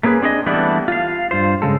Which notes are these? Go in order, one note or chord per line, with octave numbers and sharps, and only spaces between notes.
A3 A#3 C#4 G#4 B4
C4 D4 G#4 D5 D#5
E3 G3 A3 B3 D4 E4
F4 F5
G2 F4 C5
C#3 G#3 A4